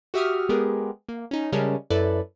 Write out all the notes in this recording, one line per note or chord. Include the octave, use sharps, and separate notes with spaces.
F#4 G4 E5 C#6 D#6 F6
G#3 B3 G4 G#4 A#4
A#3
C#4 D#4
C#3 G3 G#3 C#4 A#4 A5
F#2 E4 A4 B4 D5